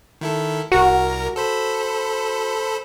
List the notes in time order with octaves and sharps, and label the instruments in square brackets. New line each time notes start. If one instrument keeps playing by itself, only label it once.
[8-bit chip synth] D#3 E4 A4
[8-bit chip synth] C2 A#4 A#6 [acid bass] F#4
[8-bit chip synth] A4 C5 B5